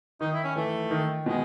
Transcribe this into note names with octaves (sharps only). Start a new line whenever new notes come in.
D#3 D#4
E4
C#4
E3 A3
D#3
B2 G#3